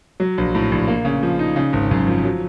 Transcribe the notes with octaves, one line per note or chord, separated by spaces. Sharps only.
F#3
A#1
A2
A#1
A#3
C#3
F3
D#4
C#3
G#1
F#2
F3
F#3